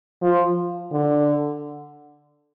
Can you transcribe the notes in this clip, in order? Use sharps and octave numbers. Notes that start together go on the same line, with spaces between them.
F3
D3